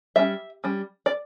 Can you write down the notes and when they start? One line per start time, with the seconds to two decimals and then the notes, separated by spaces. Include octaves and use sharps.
0.16 G3 C#4 E5
0.64 G3 C#4
1.06 D5